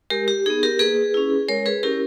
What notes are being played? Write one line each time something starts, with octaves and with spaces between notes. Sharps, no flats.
G#3 G4 A#4
G4
B3 D#4 G#4
G4 A#4
A#3 G#4 B4
C#4 E4
G#3 A#4 C#5
G#4 B4
C#4 E4 G4 A#4